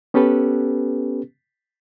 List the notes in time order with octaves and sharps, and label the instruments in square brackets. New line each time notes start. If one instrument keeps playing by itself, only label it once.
[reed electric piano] B3 C#4 G4 A4 B4